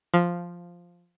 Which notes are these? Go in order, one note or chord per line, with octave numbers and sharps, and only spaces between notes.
F3